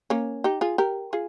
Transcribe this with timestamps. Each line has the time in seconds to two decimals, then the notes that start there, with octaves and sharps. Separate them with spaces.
0.10 A#3 C#4
0.44 D#4 G4
0.61 F4 G#4
0.78 G4 A#4
1.13 F4 G#4